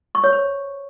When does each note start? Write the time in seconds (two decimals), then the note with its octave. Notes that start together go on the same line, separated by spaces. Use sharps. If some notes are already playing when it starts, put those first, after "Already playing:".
0.15 C#6
0.24 C#5
0.32 C5